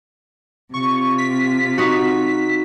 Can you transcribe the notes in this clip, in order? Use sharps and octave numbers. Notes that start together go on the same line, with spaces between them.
C3 F4 C#6
B6
D#4 F#4